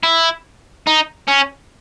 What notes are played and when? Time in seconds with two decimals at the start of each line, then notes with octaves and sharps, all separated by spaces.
0.03 E4
0.87 D#4
1.28 C#4